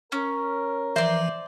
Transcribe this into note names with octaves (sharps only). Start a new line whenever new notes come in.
C#4 A#4
E3 F3 C5 D5 E5